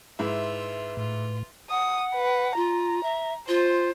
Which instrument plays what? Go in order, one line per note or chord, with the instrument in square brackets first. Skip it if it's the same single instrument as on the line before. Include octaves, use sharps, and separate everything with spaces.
[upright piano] G#2 E4 [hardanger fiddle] F4 E5 [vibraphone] B4
[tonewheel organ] A2 [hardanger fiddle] F4
[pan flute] F#5 [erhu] D#6
[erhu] B4
[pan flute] F4 [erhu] A#5
[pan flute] E5
[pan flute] F4 [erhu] C5